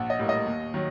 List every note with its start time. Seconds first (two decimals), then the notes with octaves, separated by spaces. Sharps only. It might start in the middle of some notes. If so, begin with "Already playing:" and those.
Already playing: A#1 F#5
0.10 D#5
0.19 A2 G3 A#3
0.29 D#5
0.47 D#2
0.74 D#3 F#3